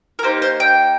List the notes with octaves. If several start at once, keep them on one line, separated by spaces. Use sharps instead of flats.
A#4
A#3 D#4 G4 C5
C5
G5